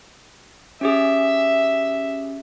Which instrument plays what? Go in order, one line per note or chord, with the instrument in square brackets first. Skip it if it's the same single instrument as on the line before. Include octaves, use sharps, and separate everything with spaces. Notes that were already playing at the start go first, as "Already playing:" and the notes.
[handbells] C#4 G4 G#4 [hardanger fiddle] E5